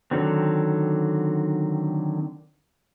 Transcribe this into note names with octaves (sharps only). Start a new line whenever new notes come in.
D3 D#3 F#3 C4